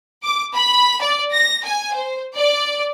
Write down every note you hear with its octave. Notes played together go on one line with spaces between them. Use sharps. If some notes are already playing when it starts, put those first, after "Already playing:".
D6
B5
D5
A#6
G#5
C5
D5